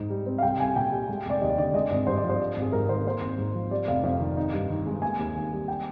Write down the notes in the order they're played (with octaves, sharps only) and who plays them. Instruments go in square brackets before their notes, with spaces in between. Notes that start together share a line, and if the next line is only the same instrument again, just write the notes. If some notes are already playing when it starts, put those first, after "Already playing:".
Already playing: [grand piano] G#2 D#4
G3
C4
[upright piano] F5
[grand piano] C2 [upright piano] G5
[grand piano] C2 [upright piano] G#5
[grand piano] A#2 [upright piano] G5
[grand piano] G3
G#3
[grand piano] F1 [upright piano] D5
[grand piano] D#2 [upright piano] D#5
[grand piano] D3 [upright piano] D5
[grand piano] G#3 [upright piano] D#5
[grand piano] G#1 [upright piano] D5
[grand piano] G2 [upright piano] C5
[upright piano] D5
[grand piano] F3
[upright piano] C5
[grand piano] G3
G#1
[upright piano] G#4
[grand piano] G#2 [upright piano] A#4
[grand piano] D#3 [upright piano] C5
[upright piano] A#4
[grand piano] A#3 [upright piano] C5
[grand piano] G#1
G#2
F3
[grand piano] G3 [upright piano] D5
[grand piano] F1 [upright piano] F5
[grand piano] F2 [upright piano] F5
[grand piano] D#3
D#4
G2
D#3
G#3
[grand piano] A#3 [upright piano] G#5
[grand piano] D#2
D#3
G3
[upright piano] G5